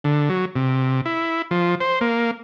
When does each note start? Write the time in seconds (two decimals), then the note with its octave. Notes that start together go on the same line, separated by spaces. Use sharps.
0.04 D3
0.29 F#3
0.56 C3
1.06 E4
1.51 F3
1.80 C5
2.01 A#3